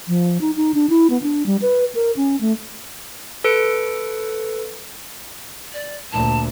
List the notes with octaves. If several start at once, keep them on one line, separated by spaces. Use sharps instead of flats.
F3
D#4
D#4
D4
E4
B3
D4
G3
B4
A#4
C#4
A3
A4 B4 C#7 D7
D5
D2 A#2 A5